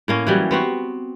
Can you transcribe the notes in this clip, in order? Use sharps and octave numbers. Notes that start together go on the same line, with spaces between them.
A2 A#3 C#4
E3 F#3 G3
B3 C4 F#4